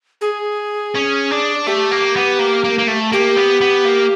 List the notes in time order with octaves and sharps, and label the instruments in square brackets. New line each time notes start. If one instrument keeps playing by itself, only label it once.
[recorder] G#4
[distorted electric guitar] C#4
D4
[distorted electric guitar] A3 [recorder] G4
[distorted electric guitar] A#3
B3
A#3
A#3
A#3
A3
[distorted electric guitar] A#3 [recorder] G4
[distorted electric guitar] B3
B3
A#3